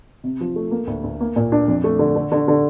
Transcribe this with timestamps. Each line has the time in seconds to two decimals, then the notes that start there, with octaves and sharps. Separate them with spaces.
0.24 C3
0.41 F3
0.56 A3
0.71 A#3
0.87 D2
1.04 D2
1.20 A#3
1.36 A#2
1.52 D4
1.68 F2
1.84 A3
1.99 D3
2.16 D3
2.32 D3
2.48 D3